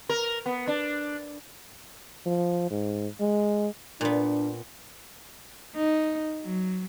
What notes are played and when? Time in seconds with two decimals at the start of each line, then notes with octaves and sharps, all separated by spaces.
0.09 A#4
0.46 B3
0.68 D4
2.26 F3
2.71 G#2
3.20 G#3
4.01 A#2 B3 D4
5.75 D#4
6.43 F#3